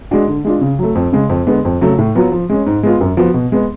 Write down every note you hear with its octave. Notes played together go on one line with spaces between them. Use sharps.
G#3 D4 F#4
D3
G#3 D4 F4
C#3
F#3 A3
F2
C#3 G#3
F2
D3 G#3 B3
F2
C#3 F#3 A3
A2
F#3 B3 F4
F3
G#3 C#4
G#2
G#3 B3 F4
F#2
F3 B3 F#4
B2
G#3 B3